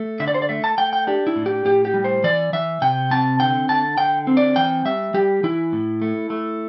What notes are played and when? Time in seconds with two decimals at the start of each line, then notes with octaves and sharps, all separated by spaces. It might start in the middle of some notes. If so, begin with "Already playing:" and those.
Already playing: A3
0.20 D3 E5
0.28 D5
0.34 C5
0.42 D5
0.49 A3 E5
0.64 A5
0.78 A3 G5
0.93 G5
1.07 D4 G4
1.27 E4
1.36 A2
1.46 G4
1.65 A2 G4
1.85 G4
1.94 G3
2.04 C5
2.24 E3 D5
2.53 E3 E5
2.81 C3 G5
3.11 C4 A5
3.40 D3 G5
3.69 D3 A5
3.98 D3 G5
4.27 C4
4.37 D5
4.56 E3 G5
4.85 G3 E5
5.14 G3 G4
5.43 E3 E4
5.72 A2
6.02 A3
6.30 A3